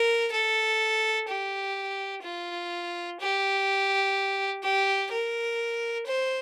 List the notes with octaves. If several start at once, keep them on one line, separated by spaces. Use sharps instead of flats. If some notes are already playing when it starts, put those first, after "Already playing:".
Already playing: A#4
A4
G4
F4
G4
G4
A#4
C5